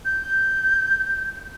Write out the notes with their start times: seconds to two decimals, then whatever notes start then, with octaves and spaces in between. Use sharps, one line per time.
0.05 G6